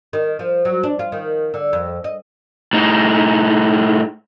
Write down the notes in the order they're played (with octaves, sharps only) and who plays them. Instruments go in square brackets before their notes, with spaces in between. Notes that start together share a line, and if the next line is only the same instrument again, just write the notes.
[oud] D#3
F3
F#3
D4
F4
D#3
D3
F2
D#5
[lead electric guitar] A2 D#4